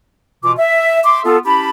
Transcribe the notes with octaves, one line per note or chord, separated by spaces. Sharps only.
B2 E3 F4 D6
E5
E5 C6 D6
B3 F4 A4
C#4 E4 G4 A5 B5